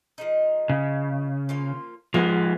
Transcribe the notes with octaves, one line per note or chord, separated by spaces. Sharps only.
F3 G#3 D#4
C#3
F3 A#3 F4
F3 G#3 B3 A#4 C5